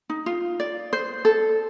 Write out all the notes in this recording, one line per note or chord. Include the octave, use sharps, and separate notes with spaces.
D#4
F4
D5
C5
A4